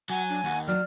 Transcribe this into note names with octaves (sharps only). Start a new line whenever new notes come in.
F#3 F#5 G#5
D4
D#2 F#5
F#3 D5 F6